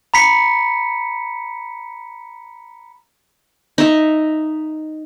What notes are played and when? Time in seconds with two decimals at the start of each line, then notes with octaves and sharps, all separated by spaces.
0.14 A#5 B5 B6 C#7
3.78 D#4 E5